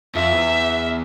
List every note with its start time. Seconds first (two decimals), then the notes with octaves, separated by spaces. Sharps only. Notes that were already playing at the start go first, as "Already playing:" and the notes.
0.15 F2 E5
0.32 E2